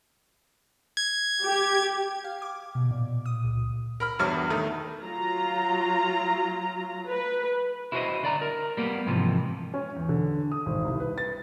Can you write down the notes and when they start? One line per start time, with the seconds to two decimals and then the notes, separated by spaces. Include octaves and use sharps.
0.97 G#6
1.43 G4
2.24 F5
2.42 D6
2.75 B2
2.91 A#2
3.26 D#6
3.44 C#2
4.00 A#4 B5 F6
4.19 E2 G2 F#4 C#5 F6
4.50 D#3 A3
5.03 F#3 F4 A#5
7.08 B4
7.92 E4 F#4 A4 B4 C5 D#5
8.23 D3 D5 A#5
8.41 A#4
8.77 G3 A#3 B3
9.07 G#2 C3 E3 F3
9.74 C#4
9.96 E2
10.09 D3
10.52 D#6
10.66 G#1
10.85 C2
11.00 B4
11.18 A6